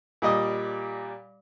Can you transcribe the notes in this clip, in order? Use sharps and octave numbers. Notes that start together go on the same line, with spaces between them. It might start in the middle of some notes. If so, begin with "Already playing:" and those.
A#2 G3 D#5 D#6